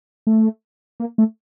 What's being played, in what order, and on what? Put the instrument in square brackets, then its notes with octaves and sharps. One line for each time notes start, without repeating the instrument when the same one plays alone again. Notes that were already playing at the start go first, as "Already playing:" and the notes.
[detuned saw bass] A3
A#3
A3